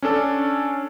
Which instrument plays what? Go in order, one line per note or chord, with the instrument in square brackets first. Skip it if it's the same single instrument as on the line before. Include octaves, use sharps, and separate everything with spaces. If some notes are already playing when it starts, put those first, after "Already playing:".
[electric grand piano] C#4 D4 A4